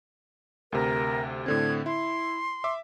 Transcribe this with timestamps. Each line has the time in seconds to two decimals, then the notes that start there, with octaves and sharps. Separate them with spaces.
0.72 D2 C3 A#4
1.46 A2 D3 C4 G#6
1.86 E4 C6
2.64 E5 D6